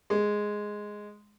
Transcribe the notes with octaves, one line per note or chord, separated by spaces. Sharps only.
G#3